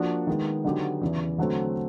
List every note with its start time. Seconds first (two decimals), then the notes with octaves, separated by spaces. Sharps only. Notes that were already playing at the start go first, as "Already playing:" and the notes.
Already playing: F3 A#3 D4 F#4
0.27 D#3 G#3 B3
0.64 D3 F#3 B3 D#4 G4
1.01 E2 C#3 E3
1.38 D3 F#3 A3 C4